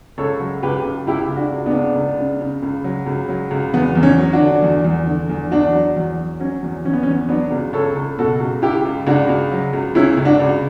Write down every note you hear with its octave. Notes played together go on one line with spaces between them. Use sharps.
C#2 A4 C#5
F#3
C#2 G4 B4
C#2
C#2 E4 G4
C#2
D4 F#4
C#2
B3 D4
C#2
C#2
C#3
C#3
C#2
F#3
C#2
F#3
C#2
E2 B3
E2
C#4
F#3
D4 F#4
D3
E2
E2
D3
E2
E2 D4 F#4
F#3
E2
F#3
F#3 C#4
E2
E2 C#4
B3
C#4
E2
F#3 B3 D4
C#2
C#2 A4 C#5
C#2
B2 F#4 A4
C#2
C#2 E4 G4
C#2
C#2 D4 F#4
C#2
F#3
C#2
C#2 C#4 E4
C#2
D4 F#4
C#2